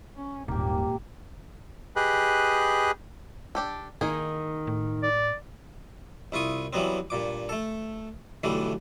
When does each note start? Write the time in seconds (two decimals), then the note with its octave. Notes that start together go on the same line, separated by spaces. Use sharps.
0.16 C#4
0.48 D#1 G#1 A#2 A#3 G4
1.96 G4 G#4 B4 D#5 F#6
3.55 D4 G4 A4
4.01 D#3 A#3 D#4 G#4
4.67 A2
5.03 D5
6.32 C2 E4 F4 C#6 D#6
6.73 E3 F#3 G3 B3 C4
7.10 G2 A#2 D6
7.49 A3 A4
8.44 B1 D3 E3 G3 A3